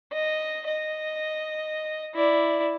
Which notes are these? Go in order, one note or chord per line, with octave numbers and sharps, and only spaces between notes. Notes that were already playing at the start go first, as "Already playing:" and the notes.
D#5
D#5
E4 D5